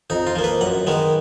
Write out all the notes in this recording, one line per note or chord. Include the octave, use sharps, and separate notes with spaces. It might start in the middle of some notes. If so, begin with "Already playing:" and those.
F2 D#4
F4
F3 A#3
B4
F#2 F#5
D#3 G#3 B3